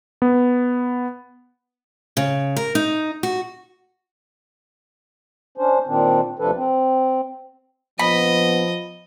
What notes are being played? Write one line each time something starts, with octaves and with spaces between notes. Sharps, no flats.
B3
C#3
A#4
D#4
F#4
C#4 D4 C5
A#2 D#3 C4 D4
D2 C3 F3 D4 A4 B4
C4
A#1 F3 B3 D#5 B5